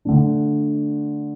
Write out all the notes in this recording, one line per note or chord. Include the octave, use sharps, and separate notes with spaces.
D3 A3 D4